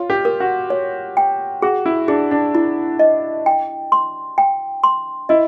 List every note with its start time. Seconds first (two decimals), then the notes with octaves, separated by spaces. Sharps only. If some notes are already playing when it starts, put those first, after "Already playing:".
Already playing: F4 C#5
0.10 G4
0.25 A#4
0.40 F#4
0.70 C#5
1.17 G5
1.62 F#4 G#4
1.86 E4
2.08 D4 G#4
2.31 D4
2.55 E4
2.99 D#5
3.46 G5
3.92 C6
4.38 G5
4.84 C6
5.29 E4 D#5